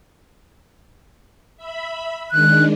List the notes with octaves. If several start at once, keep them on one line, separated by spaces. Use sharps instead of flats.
E5 B5
D#3 G#3 D4 F#6